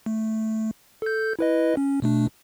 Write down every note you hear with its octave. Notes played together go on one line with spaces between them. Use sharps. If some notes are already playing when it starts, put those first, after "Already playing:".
A3
A4 G6
E4 B4 D#5
C#4
B2 A3 D4